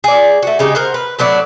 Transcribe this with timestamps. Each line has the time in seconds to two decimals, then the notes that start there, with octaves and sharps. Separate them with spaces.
0.04 G#4 D5
0.43 A3 F#4
0.59 C#3 G#3 D#4 G4
0.75 A#4 C5 F#5
0.94 B4
1.19 A2 F#3 B3 D4